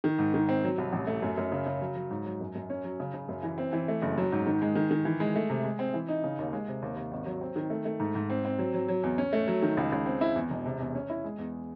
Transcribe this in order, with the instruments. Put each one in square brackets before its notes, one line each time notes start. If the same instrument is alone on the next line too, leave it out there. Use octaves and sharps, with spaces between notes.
[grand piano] D#3
G#2
D#3
C4
F#3
C2
A1
A3
F#2
F#2
C#3
C#3
F#3
F#3
G#2
F#3
F#2
F#2
C#4
F#3
C#3
C#3
F#2
E3
C4
E3
A3
F#1
F#3
G#2
D#3
G#3
D#3
D#3
E3
G#3
A3
C3
G#3
C4
E3
D#4
C#3
D#2
G#3
C3
D#2
D#2
G#1
F#3
C4
D#3
A3
A3
G#2
G#2
C4
C4
F#3
F#3
F#3
E2
C#4
A3
F#3
D#3
C#2
C#2
C4
E4
E2
E1
C3
E2
C#4
E4
G#3
E2